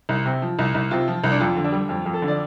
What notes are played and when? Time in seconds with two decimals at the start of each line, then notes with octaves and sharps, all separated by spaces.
0.09 C2
0.25 C3
0.42 F3
0.59 C2
0.75 C2
0.91 C3 F4
1.08 F3
1.24 C2
1.31 D4
1.40 F2 F4
1.56 D3
1.64 D4
1.72 G3
1.89 F2
2.06 F2
2.14 A4
2.22 D3
2.28 D5